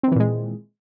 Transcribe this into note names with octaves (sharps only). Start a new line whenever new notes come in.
A#2 D#3 E3 G#3 C4